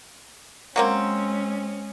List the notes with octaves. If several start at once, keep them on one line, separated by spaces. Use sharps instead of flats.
F#3 G#3 A#3 C4 C#4